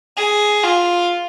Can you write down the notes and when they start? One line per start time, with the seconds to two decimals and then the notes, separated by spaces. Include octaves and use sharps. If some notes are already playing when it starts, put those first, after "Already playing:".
0.18 G#4
0.64 F4